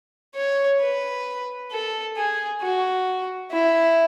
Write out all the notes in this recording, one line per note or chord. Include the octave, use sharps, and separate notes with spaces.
C#5
B4
A4
G#4
F#4
E4